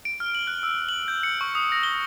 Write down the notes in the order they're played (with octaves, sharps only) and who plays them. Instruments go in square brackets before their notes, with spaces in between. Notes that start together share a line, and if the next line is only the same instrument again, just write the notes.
[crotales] D7
F6
F#7
F#6
E6
F#7
G6
C#7
C#6
D#6
A#6
G7